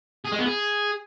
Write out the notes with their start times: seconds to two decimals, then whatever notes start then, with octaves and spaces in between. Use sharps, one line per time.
0.25 G#4
0.32 G#3
0.39 B3
0.46 G#4